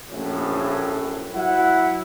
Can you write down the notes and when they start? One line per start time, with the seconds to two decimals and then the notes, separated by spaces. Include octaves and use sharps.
0.10 A#1 F#2 A2
1.35 F#3 E4 F#5